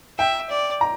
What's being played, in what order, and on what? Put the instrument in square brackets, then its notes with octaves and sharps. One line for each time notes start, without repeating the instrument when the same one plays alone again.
[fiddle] E5 [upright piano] G5
[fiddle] D5
[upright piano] A#5